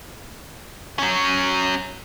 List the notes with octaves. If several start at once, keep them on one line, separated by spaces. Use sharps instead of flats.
F#3 C#4